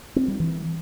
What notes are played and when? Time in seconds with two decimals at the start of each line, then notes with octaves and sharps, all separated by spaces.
0.16 C4
0.28 G3
0.40 E3